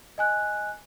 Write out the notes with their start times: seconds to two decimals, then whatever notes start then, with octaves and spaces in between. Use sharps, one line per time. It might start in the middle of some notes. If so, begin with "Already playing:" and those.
0.18 D#5 G#5 F#6